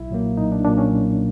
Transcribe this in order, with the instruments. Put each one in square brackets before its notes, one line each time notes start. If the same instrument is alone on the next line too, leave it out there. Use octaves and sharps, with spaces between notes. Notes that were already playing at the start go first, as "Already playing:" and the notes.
Already playing: [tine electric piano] B1 [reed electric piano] E4
[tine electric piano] A#2 F#3 A#3
[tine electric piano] B1 [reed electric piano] D#4
[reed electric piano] D4
[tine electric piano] A#2 F#3 A#3 [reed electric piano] D4
[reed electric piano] C#4
[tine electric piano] B1